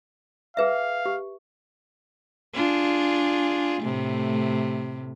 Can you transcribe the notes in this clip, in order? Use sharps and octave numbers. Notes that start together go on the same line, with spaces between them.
G#4 B4 E5 F5
G4
D4 F4 G#4
A2 C3 A3